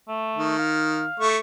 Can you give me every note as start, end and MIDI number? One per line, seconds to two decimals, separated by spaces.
0.08 0.55 57
0.37 1.04 51
0.59 1.29 77
1.20 1.38 57
1.20 1.38 85